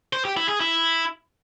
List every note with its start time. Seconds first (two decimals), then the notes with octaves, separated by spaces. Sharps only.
0.13 C5
0.25 G4
0.37 E4
0.49 G#4
0.60 E4